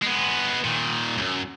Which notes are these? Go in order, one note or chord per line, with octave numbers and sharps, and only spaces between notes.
G#3 B3
A#2 D#3
C2 F#2